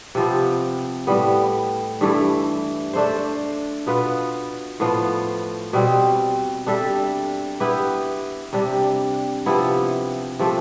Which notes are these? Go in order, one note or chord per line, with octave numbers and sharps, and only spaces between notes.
C3 F3 B3
A2 G3 B3
G2 E3 A3
A3 D4 A4 C5
B2 B3 F4 B4
A2 F3 B3 F4
B2 G3 C4
G3 D4 A4 E5
B3 E4 G4 B4
C3 G3 D4
C3 F3 B3 E4
C3 F3 A3